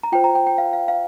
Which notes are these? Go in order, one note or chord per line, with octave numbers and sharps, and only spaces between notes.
A#5
F4 C5 G5
A#5
G5
G5
F5
F5
F5